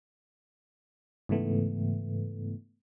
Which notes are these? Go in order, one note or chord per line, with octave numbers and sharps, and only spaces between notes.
G#2 C#3 E3 A3 B3